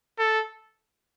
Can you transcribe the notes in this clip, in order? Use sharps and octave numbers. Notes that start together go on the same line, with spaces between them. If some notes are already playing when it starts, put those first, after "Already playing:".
A4